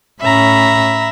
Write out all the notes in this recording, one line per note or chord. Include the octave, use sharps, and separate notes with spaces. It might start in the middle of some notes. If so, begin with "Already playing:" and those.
A2 C#4 E5 A#5 B5